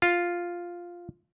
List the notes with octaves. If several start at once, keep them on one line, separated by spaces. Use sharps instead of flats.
F4